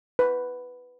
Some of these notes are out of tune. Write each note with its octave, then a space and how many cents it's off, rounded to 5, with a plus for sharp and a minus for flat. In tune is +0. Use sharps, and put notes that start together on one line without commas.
B4 +5